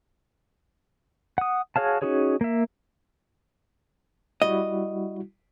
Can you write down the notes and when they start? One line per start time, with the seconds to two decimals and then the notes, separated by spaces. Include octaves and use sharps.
1.38 F#5 D#6
1.76 F#4 G#4 C#5 F5 A5
2.02 C#4 D#4 F#4 G#4 C#5
2.41 A#3 E5
4.42 G3 E4 F#4 D#5